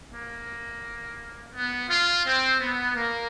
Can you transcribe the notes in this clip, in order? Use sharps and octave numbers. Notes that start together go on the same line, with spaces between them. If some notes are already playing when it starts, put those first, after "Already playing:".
A#3
B3
F4
C4
B3
A#3